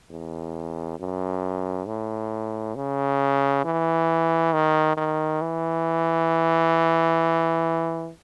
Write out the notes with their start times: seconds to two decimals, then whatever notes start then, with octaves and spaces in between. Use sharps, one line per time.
0.10 E2
1.00 F#2
1.87 A2
2.76 C#3
3.65 E3
4.53 D#3
4.97 D#3
5.42 E3